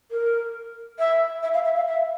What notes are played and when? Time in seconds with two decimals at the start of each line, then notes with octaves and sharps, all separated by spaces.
0.11 A#4
0.98 E5
1.42 E5
1.53 F5
1.64 E5
1.75 F5
1.86 E5